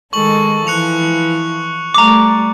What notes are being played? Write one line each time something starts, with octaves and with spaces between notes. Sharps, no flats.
D#3 G#3 A4 C#6 F#7
E3 F3 F#6 C#7 F7
G3 A3 A#5 D6